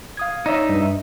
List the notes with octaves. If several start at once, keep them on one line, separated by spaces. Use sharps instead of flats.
F5 D#6 G#6
D#4 C#5 D5 E5
G2